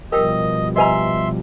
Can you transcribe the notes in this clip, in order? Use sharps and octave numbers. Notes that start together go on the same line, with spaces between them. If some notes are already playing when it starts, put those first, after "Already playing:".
B2 F3 G3 G4 A#4 D#5 G5
G4 B4 D#5 E5 G#5 A#5 C6